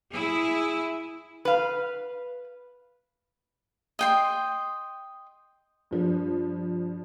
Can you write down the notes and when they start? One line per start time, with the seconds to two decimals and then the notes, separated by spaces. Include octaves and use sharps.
0.12 E4 G#4
1.45 B4 F5
3.99 D#5 G5 C6
5.91 G2 F3